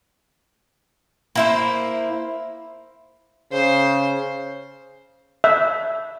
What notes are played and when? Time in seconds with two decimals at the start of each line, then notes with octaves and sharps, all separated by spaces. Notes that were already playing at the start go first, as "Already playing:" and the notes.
1.35 A#3 E4 C5
3.53 C#3 C5
5.44 E5